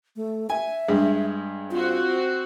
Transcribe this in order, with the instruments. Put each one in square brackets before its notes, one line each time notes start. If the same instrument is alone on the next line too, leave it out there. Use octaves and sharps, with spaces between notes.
[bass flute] A3
[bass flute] E5 [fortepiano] G#5
[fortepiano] G2 G#3
[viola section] C4 F#4 [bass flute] F4